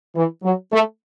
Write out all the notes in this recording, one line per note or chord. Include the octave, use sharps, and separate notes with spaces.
E3
F#3
A3